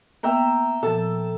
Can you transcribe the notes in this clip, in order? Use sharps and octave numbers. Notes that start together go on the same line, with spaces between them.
A#3 B3 E5 G5 A#5
A#2 F3 A4 A5